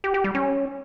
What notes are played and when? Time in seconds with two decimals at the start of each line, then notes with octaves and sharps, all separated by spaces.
0.04 G4
0.14 G4
0.24 G3
0.35 C#4